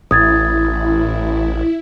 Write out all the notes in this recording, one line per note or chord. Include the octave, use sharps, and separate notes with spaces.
A1 E4 D#6 G#6 A6